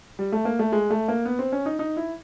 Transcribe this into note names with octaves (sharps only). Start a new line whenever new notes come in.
G3
A3
A#3
A3
G#3
A3
A#3
B3
C4
C#4
D#4
D#4
E4